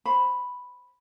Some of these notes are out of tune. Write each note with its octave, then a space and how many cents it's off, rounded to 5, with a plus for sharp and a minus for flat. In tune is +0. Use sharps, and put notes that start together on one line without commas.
C5 +10 B5 +0